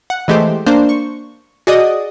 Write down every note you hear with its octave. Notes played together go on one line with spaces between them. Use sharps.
F#5
E3 G#3 A3 G4 C5
A#3 D4 C5
C#6
F#4 G#4 D5 D#5 D#6